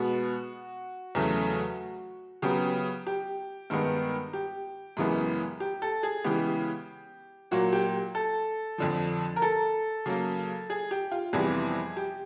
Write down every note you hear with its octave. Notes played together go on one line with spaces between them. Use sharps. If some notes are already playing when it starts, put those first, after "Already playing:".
Already playing: B2 G#3 B3 F#4
E2 C#3 F#3 A3
C#3 F#3 B3 G4
G4
G2 D#3 G#3 B3
G4
F#2 C#3 E3 G#3 B3
G4
A4
G#4
C#3 E3 G#3 B3 G4
A#2 F#3 A#3 F#4
G4
A4
F2 D3 F3
A#4
A4
C#3 F#3 A#3
G#4
G4
F4
F2 C3 E3 G3 B3 G#4
G4